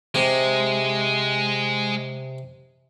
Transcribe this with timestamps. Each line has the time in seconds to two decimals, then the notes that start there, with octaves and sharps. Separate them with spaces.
0.15 C3 G#3